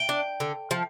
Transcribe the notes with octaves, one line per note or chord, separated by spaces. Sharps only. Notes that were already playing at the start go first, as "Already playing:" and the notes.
Already playing: G5
D4
D3
F3